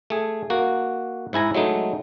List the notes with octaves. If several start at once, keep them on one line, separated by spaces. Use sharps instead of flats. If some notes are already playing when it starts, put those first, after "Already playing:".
A3 G#4
A#3 F#4
G#2 E4 G#5 A#5
F#3 G#3 A3 D#4